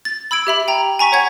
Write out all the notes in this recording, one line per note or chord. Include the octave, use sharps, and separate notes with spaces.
A6
B5 E6 G#6 D7
G4 E5 B5
G5 A#5
G#5 A#5 C#6 B6
C#5 F#5 G#6